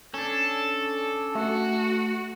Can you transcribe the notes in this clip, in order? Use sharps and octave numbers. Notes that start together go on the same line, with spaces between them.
C#4 D4 A4
A3 F#4